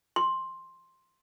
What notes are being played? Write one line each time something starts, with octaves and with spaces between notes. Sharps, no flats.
C6